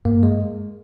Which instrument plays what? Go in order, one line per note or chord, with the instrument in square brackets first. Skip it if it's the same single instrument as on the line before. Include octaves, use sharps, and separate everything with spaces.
[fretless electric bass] G2 [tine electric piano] A#3
[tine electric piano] G#3